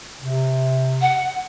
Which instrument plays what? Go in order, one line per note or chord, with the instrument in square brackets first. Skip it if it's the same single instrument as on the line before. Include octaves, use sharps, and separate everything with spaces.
[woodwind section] C3
[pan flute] F#5